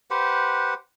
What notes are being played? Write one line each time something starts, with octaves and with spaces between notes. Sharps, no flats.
G4 B4 C5 F#5